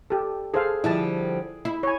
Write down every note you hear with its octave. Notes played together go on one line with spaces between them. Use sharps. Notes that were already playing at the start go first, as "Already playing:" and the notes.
G4 A4
G#4 A4 C5 F5
D3 F3 G3 E4 A5
E4
C#5 G#5